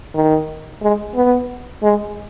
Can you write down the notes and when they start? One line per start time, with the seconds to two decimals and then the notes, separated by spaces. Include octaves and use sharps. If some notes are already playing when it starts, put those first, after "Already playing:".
0.15 D#3
0.82 G#3
1.15 B3
1.83 G#3